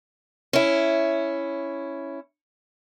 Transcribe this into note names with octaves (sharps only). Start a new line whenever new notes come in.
C#4 E4